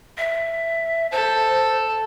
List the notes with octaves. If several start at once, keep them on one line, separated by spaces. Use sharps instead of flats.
E5
A4 C5